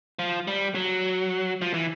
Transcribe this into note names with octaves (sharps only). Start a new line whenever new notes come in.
F3
G3
F#3
F3
E3